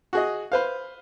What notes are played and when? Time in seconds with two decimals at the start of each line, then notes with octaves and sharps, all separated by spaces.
0.13 F#4 G#4 D#5
0.52 B4 C5 F5